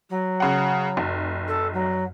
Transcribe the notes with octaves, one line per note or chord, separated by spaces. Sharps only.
F#3
C#3 F#5
F1 F#2
A4
F#3